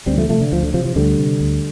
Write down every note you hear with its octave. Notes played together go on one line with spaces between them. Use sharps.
D2 G3 C4
F3 A3
C3 F3 A3
D3
D2 F3
D3
C3 F3
F3
D2 D3 G3
C3
D2